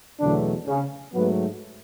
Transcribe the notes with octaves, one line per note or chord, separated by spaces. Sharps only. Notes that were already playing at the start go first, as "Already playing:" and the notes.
E2 B2 D3 F#3 A3 D4
C#3 C#4
G#2 F#3 A3 B3